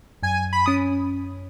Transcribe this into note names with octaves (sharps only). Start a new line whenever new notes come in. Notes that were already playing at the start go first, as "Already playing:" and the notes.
F#2 G#5
B5
C#4 D#6